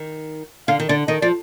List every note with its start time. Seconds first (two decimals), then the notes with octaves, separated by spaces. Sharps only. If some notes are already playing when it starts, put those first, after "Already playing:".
Already playing: D#3
0.68 D3 F5
0.80 D#3
0.88 D3 D5
1.08 D#3 D#5
1.22 F3 D5